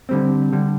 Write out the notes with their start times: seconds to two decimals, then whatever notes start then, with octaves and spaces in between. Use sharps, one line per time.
0.09 D3 G3 C4
0.53 D3 G3